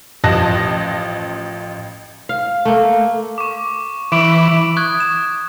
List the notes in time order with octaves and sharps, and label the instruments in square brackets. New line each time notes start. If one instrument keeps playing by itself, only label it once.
[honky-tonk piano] A1 F3 D#5 A5 F#6 A#6
[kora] F5
A3 A#3
[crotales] C#6 D6
[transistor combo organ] E3 [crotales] D6 D7 F#7
[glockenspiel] C#6 D#6 F#6 G#6
E7